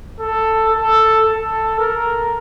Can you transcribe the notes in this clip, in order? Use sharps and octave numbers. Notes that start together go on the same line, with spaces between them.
A4
A4
A4
A#4